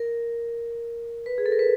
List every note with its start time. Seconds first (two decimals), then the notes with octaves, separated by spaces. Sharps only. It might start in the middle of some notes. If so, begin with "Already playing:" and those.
Already playing: A#4
1.26 B4
1.38 G#4
1.46 A4
1.52 A#4
1.59 B4